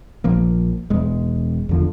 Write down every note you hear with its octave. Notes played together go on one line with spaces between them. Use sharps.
A#1 F3 A#3
E1 G#3
E2 D3 F3